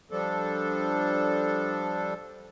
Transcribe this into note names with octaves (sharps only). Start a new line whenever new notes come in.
F3 G3 D4 A4